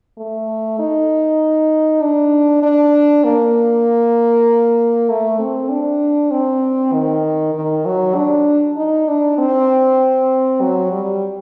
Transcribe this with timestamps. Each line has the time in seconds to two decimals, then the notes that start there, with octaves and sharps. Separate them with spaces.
0.18 A3
0.79 D#4
2.01 D4
2.62 D4
3.24 A#3
5.09 A3
5.39 C4
5.70 D4
6.31 C4
6.93 D#3
7.55 D#3
7.86 F#3
8.15 D4
8.77 D#4
9.08 D4
9.38 C4
10.61 F#3
10.91 G3